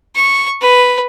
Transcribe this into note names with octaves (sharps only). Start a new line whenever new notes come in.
C#6
B4